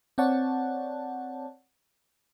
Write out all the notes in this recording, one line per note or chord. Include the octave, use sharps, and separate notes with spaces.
C4 C#5 D5 F#5 A5